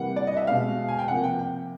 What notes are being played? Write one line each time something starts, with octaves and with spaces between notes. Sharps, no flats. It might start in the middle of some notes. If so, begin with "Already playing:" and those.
Already playing: C3 E3 G3 A#3 F#5
D5
D#5
E5
B2 G#3 F5
G#5
G5
C3 F3 A#3 F#5
G5
G5